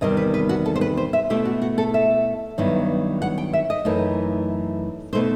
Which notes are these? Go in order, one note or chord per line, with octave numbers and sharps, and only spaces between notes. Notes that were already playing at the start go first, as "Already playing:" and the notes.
E2 C3 D#3 G3 D#5
B4
B4
F#4
A4
C5
B4
C5
E5
B2 A3 E4 G4
F#4
F#4
A4
E5
G2 D#3 F#3 B3 E4
F#5
G5
E5
D#5
F#2 E3 A3 D#4
B2 A3 D#4 C5